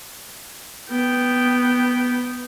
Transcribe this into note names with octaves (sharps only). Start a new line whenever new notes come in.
B3 G5